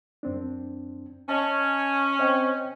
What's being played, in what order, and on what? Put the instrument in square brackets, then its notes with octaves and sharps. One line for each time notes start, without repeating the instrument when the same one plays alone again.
[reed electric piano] F#2 C4 D4
[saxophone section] C#4 [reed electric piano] D#5 A5
[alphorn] C4 [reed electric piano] C#5 D#5 G5